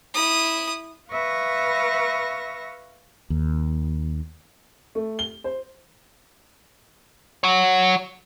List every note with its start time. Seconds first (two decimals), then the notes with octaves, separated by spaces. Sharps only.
0.14 E4 D#6
1.10 B4 E5 F5 C#6 A#6
3.30 D#2
4.95 A3
5.19 G7
5.44 C5
7.44 F#4 C#5